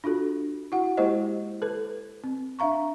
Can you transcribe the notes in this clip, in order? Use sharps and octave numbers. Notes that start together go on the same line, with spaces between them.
D4 F4 F#4 A4
E4 F#4 F#5
G#3 A#3 E4 G4 C5 D#5
A4 B4
C4
D4 E5 F5 A#5 C#6